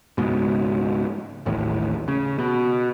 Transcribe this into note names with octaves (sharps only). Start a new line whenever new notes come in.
C#2 G#2 B2
A1 D#2 A2
C#3
B2